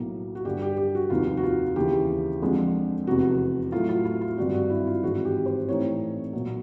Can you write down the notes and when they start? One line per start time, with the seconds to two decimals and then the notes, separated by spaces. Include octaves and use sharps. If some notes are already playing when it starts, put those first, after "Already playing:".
Already playing: B1 A2 F#3 A#3
0.35 F#4
0.45 G2 D3 G3 G4
0.62 G4
0.77 G4
0.95 F#4
1.10 F1 D#2 D#3 F4
1.37 F#4
1.43 F4
1.76 D#2 C#3 E3 G4
2.42 F2 D3 F3 G#3
3.07 F1 E2 C3 F#4
3.71 A2 F#3 A3 F4
3.89 F4
4.05 F4
4.21 F4
4.38 G#1 G2 D3 G3 F#4
4.54 F#4
4.70 E4
4.87 F4
5.03 G#1 G#2 E3 G#3 F#4
5.25 G4
5.46 C5
5.68 A2 E3 A3 C4 D#4 C#5
6.33 B1 A#2 F#3